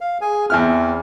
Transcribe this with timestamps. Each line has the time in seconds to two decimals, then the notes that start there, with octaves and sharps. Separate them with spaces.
0.01 F5
0.21 G#4 G#5
0.50 E2 C4 E4 F6